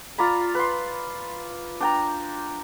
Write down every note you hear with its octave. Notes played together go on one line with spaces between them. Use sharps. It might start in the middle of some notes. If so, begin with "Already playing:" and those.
F4 D5 A#5 B5
B4 C6
D4 G5 A#5